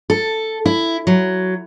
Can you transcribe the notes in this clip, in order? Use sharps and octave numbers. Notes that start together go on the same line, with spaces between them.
A4
E4
F#3